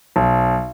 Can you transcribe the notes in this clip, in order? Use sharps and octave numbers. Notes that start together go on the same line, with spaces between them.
B1